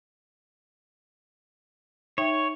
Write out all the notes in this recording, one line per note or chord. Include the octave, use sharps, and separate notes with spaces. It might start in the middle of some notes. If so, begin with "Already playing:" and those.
D#4 C#5 E5 G5